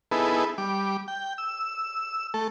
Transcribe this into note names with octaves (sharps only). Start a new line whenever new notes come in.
B3 D#4 E4 G#4 A4 B4
G3 D6
G5
E6
A3 A4